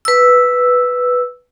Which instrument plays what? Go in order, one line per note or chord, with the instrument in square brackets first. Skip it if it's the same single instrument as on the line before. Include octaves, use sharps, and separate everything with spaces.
[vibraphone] B4 E6